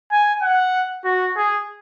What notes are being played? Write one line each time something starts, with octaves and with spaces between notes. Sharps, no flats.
G#5
F#5
F#4
G#4